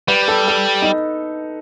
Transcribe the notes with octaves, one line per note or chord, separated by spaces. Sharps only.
G3 B4
A4
A4
D#4